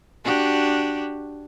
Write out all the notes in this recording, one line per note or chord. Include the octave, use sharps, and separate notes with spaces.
D4 F#4 G4